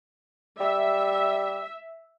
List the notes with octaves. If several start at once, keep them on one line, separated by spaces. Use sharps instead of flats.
G3 E5